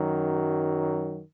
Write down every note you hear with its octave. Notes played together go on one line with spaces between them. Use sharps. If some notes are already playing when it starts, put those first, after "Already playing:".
Already playing: F#2 D#3 F#3